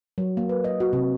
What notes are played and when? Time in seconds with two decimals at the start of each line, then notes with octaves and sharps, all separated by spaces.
0.18 F#3
0.37 A#3
0.49 B4
0.64 D#5
0.80 F#4
0.93 C3